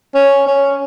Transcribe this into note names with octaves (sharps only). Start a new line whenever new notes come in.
C#4
C#4